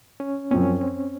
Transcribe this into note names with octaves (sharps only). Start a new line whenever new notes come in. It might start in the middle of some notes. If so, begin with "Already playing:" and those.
C#4
F#2 F3 C4 C#4
C4